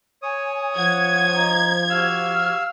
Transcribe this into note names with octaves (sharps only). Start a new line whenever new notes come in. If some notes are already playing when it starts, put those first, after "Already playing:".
C#5 G#5 D#6
F3 F#5 G#6
D#5 A#5
F#4 G4 F5 E6 F6